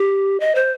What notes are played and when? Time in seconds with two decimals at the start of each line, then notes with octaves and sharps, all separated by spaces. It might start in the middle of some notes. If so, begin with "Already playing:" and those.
Already playing: G4
0.40 D#5
0.55 C5